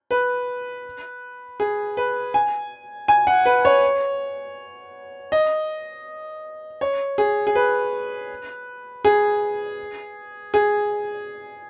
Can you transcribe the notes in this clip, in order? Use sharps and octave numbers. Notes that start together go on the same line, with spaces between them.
B4
G#4
B4
G#5
G#5
F#5
B4
C#5
D#5
C#5
G#4
G#4
B4
G#4
G#4